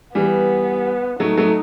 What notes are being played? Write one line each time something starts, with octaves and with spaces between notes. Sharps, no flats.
E3 G3 B3
F#3 A3 D#4
F#3 A3